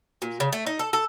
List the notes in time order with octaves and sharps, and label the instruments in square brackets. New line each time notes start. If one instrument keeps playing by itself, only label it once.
[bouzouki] A#2
C#3
A3
D#4
A4
A4